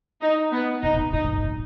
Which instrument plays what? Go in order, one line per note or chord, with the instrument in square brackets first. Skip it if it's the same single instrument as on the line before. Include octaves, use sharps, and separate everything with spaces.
[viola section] D#4
B3
[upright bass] B2 [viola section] D#4
[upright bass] G#2
A#2
[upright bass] G#2 [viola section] D#4
[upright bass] G#2
F#2
G#2
A#2